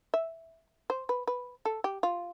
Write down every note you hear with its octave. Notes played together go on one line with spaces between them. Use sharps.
E5
C5
B4
B4
A4
G4
F4